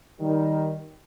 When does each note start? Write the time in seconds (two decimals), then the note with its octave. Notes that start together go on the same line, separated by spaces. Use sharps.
0.21 D#3 G3